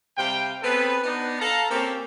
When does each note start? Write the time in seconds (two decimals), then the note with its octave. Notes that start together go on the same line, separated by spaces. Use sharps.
0.17 C3 G3 F5 G5
0.63 B3 C4 G#4 A4 B4
1.04 B3 D4 D#4
1.40 A4 F5 A#5
1.70 A#3 C4 C#4 G4 A4 A#4